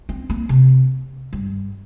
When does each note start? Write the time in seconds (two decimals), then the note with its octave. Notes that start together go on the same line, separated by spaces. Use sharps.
0.09 C4
0.30 A#3
0.49 C3
1.33 G2